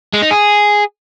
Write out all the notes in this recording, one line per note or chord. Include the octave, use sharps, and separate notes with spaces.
G#3
D#4
G#4